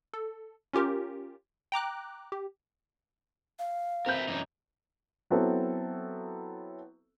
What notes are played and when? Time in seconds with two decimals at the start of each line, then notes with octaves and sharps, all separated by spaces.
0.14 A4
0.73 C#4 F4 G4 A#4
1.72 G5 A#5 D6 F#6
2.32 G4
3.59 F5
4.06 C4 A#4 B4 E5 G6
4.28 F#2 E3 D#4
5.30 F#3 B3 C4 E4 A4